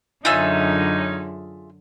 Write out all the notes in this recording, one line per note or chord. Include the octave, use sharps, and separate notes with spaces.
F#2 A#2 D3 C#4 D#4 F4 G#4 E5